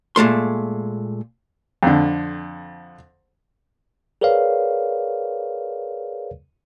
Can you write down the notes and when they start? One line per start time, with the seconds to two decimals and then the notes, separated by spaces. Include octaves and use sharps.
0.16 A#2 G#3 A3 C6
1.83 F2 D3
4.21 G#4 A#4 B4 C#5 D5 F5